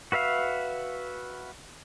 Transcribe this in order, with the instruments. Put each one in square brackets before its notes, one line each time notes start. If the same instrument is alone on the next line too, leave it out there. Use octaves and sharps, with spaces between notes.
[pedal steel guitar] F#4 B4 E5 F5